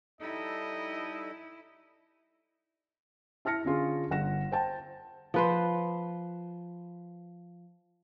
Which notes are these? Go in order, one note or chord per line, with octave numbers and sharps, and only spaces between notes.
G3 D#4 E4 A4 D#5
E4 A5 F6 A#6 C#7
D3 C#4 F4 G#4
G1 F#5 A#6 E7
C5 G5 A5
F3 B4 C5